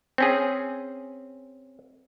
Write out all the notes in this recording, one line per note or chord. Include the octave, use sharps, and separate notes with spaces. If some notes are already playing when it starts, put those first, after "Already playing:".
C4 C#4 G#4